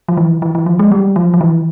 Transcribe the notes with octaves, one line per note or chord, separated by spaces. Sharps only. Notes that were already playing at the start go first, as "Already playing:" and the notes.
F3
E3
E3
E3
F3
G#3
G3
F3
F3
E3